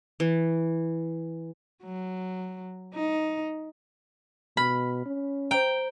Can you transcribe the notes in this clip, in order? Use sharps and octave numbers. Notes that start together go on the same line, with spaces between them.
E3
F#3
D#4
B2 B5 F6
C#4
C5 G5 A#5